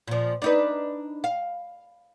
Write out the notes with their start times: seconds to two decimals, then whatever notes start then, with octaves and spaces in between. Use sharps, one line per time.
0.08 A#2 F3
0.42 D4 D#4 B4
1.24 F5